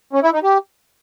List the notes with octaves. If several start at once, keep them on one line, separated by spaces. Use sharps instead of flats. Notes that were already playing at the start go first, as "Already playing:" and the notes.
C#4
E4
D#4
G4